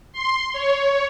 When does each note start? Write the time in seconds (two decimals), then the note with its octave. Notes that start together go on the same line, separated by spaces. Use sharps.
0.13 C6
0.53 C#5